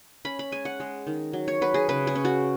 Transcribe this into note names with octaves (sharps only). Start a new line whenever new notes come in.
C#4 B5
B5
G#3 G#5
F#5
G#3
D#3
F#3
C#5
F#3 B4
G#4
C#3 B4
G#4
C#4
F#4